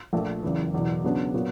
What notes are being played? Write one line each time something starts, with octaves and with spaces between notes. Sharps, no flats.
A#1 A#2 F3 A3
F#1 E2 C#3 E3
F#1 E2 B2
C#3 F#3 B3 D4
A#2 F#3 B3